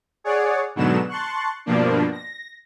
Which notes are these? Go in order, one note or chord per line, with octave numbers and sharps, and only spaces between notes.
G#4 C#5 D5 F#5
G#2 B2 D3 F#3 B3 E7
A5 C6 C#6 F#6
G2 B2 F3 A#3 D4
A#6